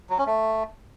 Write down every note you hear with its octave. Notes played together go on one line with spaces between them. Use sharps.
F#3
C#4
A3